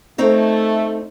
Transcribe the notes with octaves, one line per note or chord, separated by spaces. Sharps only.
A3 C4 D#4 C#5